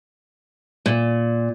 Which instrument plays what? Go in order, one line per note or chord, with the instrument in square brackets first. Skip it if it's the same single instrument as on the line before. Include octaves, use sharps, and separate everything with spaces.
[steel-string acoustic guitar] A#2